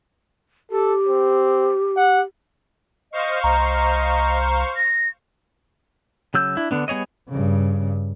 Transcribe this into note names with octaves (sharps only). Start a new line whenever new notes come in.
G4 A4
C4
F#5
C5 D#5 F5 C#6
C2 D#5 A#5
A#6
C#3 F#3 E6 G6
D4 E4
D3 B3 D4
G3 B3 G#4 C#5 D#5
G2 C#3